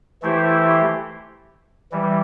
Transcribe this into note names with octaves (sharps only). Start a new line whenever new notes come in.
E3 A3 E4 G4 C5
E3 G3